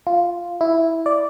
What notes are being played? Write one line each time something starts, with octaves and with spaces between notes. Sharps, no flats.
F4
E4
D5